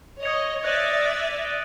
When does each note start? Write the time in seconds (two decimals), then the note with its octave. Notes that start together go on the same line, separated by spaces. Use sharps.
0.23 C#5 D#5 D#6 G#6 C#7 F7
0.63 D5 E5 F#6 A#6 D#7 F#7
1.05 F#6 A#6 D#7 F#7
1.45 A6 D7 G7